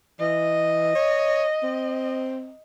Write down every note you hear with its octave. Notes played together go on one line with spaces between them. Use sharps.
E3 D#5
C#5
C4